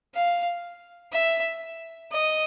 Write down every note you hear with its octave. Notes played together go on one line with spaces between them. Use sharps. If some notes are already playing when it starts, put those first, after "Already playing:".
F5
E5
D#5